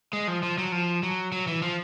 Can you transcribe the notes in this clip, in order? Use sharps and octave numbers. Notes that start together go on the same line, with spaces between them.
G#3
F3
F3
F#3
F3
F#3
F#3
E3
F3